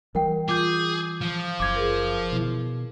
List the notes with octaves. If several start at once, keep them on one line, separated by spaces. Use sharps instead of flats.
E3 G3 A#4 F#5 G5
F4 G#4 D6 G6
F3
F#1 D6 G#6
G#4 A#4
B2 E4